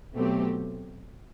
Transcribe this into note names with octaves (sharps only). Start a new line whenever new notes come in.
B2 F#3 A3 C4 G4